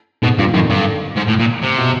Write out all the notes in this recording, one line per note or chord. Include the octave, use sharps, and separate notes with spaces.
G#2 B2
G2 A#2
F#2 D#3
G2 D3
G#2
A2
A#2
C3
B2